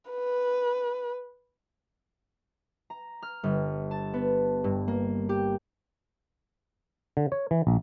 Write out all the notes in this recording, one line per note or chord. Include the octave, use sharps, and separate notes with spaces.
B4
A#5
F6
G1
A5
B3
G2
A#3
G4
D3
C#5
E3
A#1